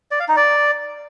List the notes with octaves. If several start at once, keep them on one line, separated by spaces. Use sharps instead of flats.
D5
F5
D#4
D5